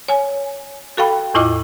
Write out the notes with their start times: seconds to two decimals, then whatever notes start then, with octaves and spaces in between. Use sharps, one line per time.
0.08 C#5 G#5
0.97 F#4 A4 F5 G5 B5
1.34 E2 A2 E4 F4 D#5 D6